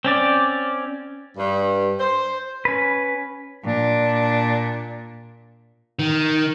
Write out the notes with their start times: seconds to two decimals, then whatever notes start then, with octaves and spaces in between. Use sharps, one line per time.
0.05 C4 C#4 D5
1.37 G2
1.99 C5
2.65 C#4 B4
3.65 A#2 D4
5.99 D#3